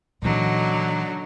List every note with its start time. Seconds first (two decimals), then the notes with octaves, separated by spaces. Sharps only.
0.22 A#2 D3 E3 F#3 D#4